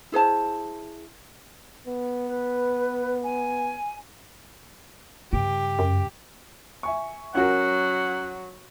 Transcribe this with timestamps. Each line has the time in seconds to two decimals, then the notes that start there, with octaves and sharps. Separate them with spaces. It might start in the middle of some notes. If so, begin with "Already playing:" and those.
0.12 E4 G#4 C5 A5
1.87 B3
2.27 B4
3.23 G#5
5.33 G2 C#3 G4
5.79 F#2
6.83 E5 G#5 C#6
7.35 F#3 C#4 F#4 A#4 F#5